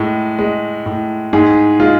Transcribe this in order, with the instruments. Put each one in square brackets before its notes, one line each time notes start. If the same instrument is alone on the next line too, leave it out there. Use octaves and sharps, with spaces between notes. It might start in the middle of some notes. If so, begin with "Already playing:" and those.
Already playing: [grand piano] A2 G#3
G#3
A2
G#2 G#4
G#3 F4